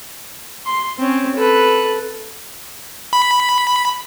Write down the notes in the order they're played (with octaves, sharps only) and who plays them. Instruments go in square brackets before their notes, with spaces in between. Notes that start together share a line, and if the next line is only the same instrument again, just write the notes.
[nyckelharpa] C6
C4 C#4
A4 B4
[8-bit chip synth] B5